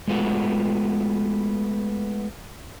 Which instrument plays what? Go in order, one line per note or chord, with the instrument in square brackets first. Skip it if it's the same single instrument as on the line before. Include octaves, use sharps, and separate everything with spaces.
[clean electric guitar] G#3 A3 B3 F4 F#4